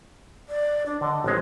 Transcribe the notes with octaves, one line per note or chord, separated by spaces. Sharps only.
D5
D4
D3 D#5
A1 G#3 C4